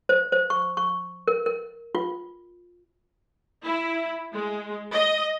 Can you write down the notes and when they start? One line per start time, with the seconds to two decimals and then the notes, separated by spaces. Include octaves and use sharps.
0.09 C5
0.32 C5
0.50 C#6
0.77 C#6
1.28 A#4
1.46 A#4
1.95 F4
3.64 E4
4.33 G#3
4.93 D#5